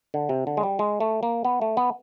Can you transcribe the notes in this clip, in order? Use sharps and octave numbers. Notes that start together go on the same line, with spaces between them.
D3
C3
D3
G#3
G3
G#3
A3
A#3
B3
A3
B3